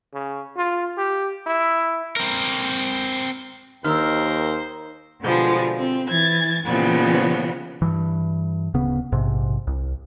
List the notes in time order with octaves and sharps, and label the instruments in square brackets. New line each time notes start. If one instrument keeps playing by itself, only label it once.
[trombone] C#3
F4
G4
E4
[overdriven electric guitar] C4 A#4
[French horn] D#2 [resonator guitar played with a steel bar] D#3 [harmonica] A#4 C5 [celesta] E6 F6
[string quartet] B2 D3 F3 G3 G#3
C4
E3 G#6 A6
A#2 C#3 E3 F3 G3 B3
[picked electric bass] G2 E3
D1 C#3 B3
A#1 G#2 C3
C2